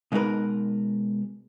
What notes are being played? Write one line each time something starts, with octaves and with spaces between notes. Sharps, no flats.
B2 G#3 D#4 G#4 A#4 B4